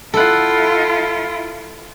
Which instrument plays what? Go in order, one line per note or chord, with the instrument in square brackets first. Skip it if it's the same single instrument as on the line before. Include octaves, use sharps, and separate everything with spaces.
[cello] E4 F4 [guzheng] A4 F#5